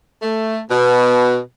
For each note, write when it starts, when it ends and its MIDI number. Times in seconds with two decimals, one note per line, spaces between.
0.22 0.59 57
0.70 1.38 47